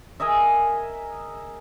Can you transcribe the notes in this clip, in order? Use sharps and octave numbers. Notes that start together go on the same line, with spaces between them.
G#4 A#4 D#5 E5